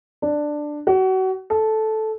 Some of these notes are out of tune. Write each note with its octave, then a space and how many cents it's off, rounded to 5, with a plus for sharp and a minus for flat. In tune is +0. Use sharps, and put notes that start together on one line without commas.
D4 +10
F#4 +30
A4 -10